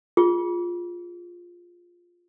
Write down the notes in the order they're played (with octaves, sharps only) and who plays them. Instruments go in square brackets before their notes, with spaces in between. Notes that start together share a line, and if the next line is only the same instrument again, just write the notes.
[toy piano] F4 G#4